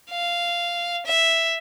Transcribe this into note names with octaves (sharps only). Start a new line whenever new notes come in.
F5
E5